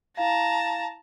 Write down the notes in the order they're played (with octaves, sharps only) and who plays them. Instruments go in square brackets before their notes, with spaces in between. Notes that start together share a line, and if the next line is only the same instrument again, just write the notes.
[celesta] E4 F5 [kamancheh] A5 A#5